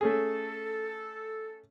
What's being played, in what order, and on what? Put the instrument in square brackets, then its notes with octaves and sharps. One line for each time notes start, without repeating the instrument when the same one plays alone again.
[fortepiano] A3 C#4 G#4 [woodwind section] A4